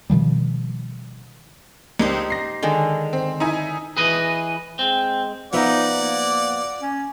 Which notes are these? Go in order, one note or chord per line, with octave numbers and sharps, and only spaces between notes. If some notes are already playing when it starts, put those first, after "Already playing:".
B2 D#3 F3 G3
C#2 A#3 D4 D#4 G4 C5
A#6 C7
D3 D#3 G#3
C4
D#4 E4 G#5
E3 G#4 B4 D#5
G#3 C4
F3 B3 D#4 D5 E5 F#5
A#3
C#4